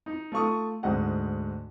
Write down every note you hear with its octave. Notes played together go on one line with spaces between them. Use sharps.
D#4
A3 F4 C#6 D#6
D2 G#2 D#5 F#5